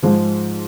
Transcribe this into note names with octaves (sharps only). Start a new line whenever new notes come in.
G#2 F3 G#3 C5